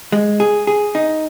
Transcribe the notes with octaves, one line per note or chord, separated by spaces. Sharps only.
G#3
G#4
G#4
D#4